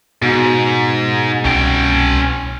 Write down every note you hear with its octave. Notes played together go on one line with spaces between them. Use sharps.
G#2 B2
C2 C#4 G5